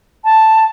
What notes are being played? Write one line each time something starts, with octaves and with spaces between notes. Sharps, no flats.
A5